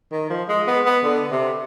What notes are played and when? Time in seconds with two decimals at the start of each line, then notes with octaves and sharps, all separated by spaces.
0.12 D#3
0.30 F3
0.48 G#3
0.67 B3
0.85 B3
1.03 D3
1.31 C3